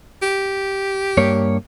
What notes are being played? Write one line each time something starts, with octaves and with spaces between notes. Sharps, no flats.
G4
G2 A#3 C#5